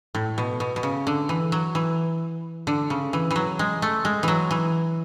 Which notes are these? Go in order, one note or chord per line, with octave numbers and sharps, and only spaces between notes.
A2
B2
B2
B2
C#3
D3
E3
F#3
E3
D3
C#3
E3
E3
F#3
G#3
A3
G#3
E3 F#3
E3